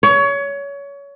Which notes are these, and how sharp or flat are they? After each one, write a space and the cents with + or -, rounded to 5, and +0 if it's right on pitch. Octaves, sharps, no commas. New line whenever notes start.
C#5 +25